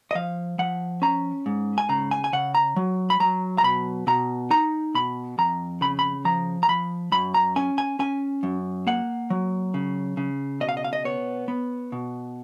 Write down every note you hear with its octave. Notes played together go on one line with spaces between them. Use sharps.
D#5
F3 F5
F3 F#5
C#4 A#5
G#2
G#5
C#3 A#5
G#5
G#5
C#3 F#5
A#5
F#3
B5
F#3 A#5
A#5
B2 B5
B2 A#5
D#4 A#5
B2 B5
F2 A#5
C#3 B5
B5
F3 A#5
A#5
F3 B5
F#2 B5
A#5
C#4 G#5
G#5
C#4 G#5
F#2
A#3 F#5
F#3
C#3
C#3
B2 D#5
F5
D#5
F5
D#5
B3 C#5
B3
B2